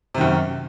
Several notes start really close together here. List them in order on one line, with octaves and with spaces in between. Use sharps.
C3 D#3 F#2